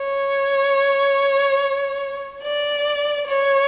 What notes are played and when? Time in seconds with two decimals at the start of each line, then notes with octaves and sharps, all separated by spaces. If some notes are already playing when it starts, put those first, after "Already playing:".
Already playing: C#5
2.43 D5
3.27 C#5